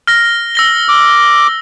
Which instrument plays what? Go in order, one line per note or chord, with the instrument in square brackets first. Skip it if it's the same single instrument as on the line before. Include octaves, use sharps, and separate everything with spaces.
[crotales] F6 A#6
E6 A#6 G7
[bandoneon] D6